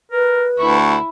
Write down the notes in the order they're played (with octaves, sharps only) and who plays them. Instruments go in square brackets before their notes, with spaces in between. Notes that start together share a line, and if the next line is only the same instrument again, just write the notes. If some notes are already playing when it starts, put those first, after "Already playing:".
[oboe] A#4 [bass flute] B4
[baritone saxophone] D2 [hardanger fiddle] E4 [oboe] C#6